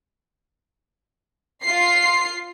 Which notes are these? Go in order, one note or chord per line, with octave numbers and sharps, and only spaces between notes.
F4 C7